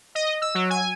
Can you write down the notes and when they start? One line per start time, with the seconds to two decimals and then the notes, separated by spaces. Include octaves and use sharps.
0.15 D#5
0.42 E6
0.55 F#3
0.70 G#5